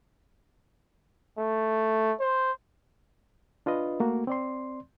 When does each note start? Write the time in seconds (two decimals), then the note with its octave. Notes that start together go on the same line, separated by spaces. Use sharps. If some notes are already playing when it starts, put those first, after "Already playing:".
1.38 A3
2.20 C5
3.66 D4 F4 B4 D#5
4.00 A3 A#3 F#4
4.27 C4 D5 C6